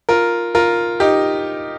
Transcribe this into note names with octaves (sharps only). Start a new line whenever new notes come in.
F4 A#4
F4 A#4
D#4 G4